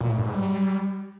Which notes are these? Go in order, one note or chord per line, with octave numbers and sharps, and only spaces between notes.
A#2
A2
G2
G#2
G3